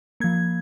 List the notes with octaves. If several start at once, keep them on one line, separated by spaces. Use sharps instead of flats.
F3 A#3 G#6